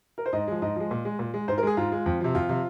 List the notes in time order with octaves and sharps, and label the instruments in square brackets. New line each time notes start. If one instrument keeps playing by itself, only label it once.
[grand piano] A#4
C5
G#2 D#5
F3 G#3
G#2 D#5
F3 G#3
A#2
G#3
A#2
G#3
G#2 C5
A#4
G#3 G#4
G#2 F4
G#3
F2
C3 F3
F2 F4
C3 F3